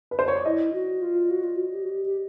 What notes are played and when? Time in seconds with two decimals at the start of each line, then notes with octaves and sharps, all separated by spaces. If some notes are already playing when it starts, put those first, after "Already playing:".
0.11 B4
0.19 C5
0.28 C#5
0.36 D5
0.45 E4 D#5
0.73 F#4
1.02 F4
1.30 F#4
1.44 F4
1.56 F#4
1.74 G4
1.82 F#4
1.89 G4
2.06 G4